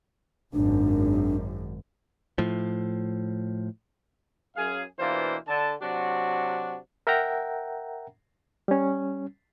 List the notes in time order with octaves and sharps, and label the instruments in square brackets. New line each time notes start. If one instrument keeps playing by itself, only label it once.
[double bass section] G#1 F#2 [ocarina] D4
[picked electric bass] A2 F3
[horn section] F#2 G#4 F5
B2 E3 A#3 D4 F4 C5
D3 A5
C3 F#3 D4 F#4
[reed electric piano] A#4 E5 F#5 G5 A#5
G3 C#4